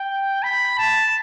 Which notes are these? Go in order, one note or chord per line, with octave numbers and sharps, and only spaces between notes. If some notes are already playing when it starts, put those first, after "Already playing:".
Already playing: G5
B5
A5